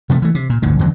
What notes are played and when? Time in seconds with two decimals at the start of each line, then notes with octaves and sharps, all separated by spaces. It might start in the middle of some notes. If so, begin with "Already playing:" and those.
0.10 C3 F3 G3 A3
0.22 E3 A3
0.35 C3
0.50 A#2
0.62 G1 D2 A2 D3
0.79 A1 E2 D3 F#3